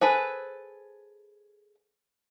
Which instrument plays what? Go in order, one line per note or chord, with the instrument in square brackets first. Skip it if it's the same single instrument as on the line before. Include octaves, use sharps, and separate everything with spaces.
[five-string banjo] G#4 A4 B4 [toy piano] C5 G#5